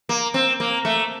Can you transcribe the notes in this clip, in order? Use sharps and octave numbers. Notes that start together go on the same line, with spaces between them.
A#3
C4
A#3
A3